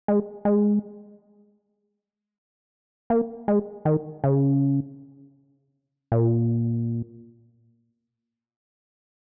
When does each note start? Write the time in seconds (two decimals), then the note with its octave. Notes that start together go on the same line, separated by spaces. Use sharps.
0.08 G#3
0.45 G#3
3.10 A#3
3.48 G#3
3.85 D#3
4.24 C#3
6.12 A#2